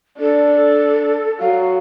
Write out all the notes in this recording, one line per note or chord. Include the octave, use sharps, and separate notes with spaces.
D4 A4
F#3 F5